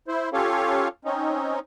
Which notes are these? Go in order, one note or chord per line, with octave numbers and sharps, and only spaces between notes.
E4 C5
C#4 F4 G4 A4 C#5 F5
C4 C#4 D#4